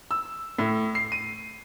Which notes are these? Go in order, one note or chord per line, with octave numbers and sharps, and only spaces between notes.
E6
A2
C7
D#7